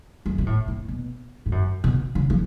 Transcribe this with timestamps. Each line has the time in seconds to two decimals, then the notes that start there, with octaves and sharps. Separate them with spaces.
0.26 F#2
0.38 B2
0.46 A2
0.68 B2
0.88 B2
1.46 G#2
1.52 F#2
1.84 B2
2.15 C#3
2.30 F3